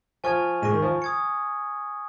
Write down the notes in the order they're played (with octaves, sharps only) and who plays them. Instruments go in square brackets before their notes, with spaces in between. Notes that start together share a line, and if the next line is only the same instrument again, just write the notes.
[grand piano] F3 [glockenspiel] G#5 C#6 F6 G#6 F7
[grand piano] G#2 G#3 [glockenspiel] C#6 A#6 D#7
[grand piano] D#3
F3
[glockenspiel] D#6 G#6 C#7